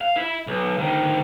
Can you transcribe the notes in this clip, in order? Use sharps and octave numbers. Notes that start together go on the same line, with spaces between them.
F5
E4 E5
B1
D2 D#3